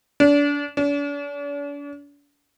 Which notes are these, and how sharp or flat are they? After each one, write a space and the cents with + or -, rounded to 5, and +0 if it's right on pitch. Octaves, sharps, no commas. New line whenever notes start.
D4 -30
D4 -45